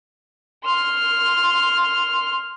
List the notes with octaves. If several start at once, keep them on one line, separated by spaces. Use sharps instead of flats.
C6 F6